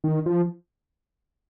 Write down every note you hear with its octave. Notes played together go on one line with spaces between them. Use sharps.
D#3
F3